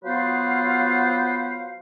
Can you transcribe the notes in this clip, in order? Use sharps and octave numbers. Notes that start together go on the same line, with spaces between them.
F#3 B3 F4 B4 C5 F5